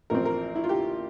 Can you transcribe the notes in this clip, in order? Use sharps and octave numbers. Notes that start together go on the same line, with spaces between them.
A1 A2 F3 C4 A#4
A#4
E4
F4
G4